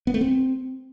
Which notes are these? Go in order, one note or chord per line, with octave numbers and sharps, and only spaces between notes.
B3
A3
C4